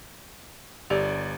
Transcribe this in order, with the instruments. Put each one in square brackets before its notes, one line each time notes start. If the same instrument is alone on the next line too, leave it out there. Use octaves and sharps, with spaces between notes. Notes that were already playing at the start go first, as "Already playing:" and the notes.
[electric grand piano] G1 D5 [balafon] G4